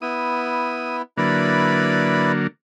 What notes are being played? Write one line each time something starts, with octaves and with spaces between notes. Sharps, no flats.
B3 E4 D#6
D3 F#3 A#3 E4 B4 D5